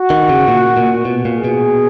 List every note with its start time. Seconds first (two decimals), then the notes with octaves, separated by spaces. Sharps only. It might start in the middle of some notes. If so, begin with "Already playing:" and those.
Already playing: F#4
0.10 D#3
0.29 C#3
0.48 A#2
0.77 A#2
1.05 B2
1.25 A#2
1.35 G#4
1.44 B2